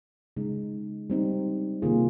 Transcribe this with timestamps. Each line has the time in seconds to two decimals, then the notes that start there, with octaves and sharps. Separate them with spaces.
0.37 C#3 G#3 D#4
1.10 G3 C4 D#4
1.82 C3 D#3 A#3 F4 G#4